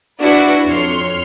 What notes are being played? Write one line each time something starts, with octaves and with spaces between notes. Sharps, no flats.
D4 E4 F#4 B4 D5
F2 C#5 C6 F6